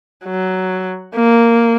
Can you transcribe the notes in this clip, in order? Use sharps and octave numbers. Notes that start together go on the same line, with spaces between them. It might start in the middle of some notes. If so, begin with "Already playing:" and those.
F#3
A#3